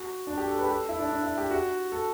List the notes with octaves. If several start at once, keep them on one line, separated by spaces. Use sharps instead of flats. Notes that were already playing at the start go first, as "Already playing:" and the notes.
Already playing: F#4
D4
G4
A4
B4
G4
A4
E4
D4
D4
E4
G4
F#4
A4